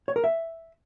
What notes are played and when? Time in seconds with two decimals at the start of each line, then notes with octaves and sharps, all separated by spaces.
0.08 C#5
0.16 A#4
0.24 E5